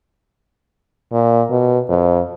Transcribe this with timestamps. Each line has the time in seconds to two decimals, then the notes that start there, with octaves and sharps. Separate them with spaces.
1.13 A#2
1.50 B2
1.89 F2